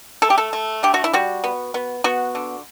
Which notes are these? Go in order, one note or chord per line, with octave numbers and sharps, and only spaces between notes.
A3 A4
G4
A4
A3
D3 G4
F#4
E4
G3 F#4
B3
B3
B3 F#4
D3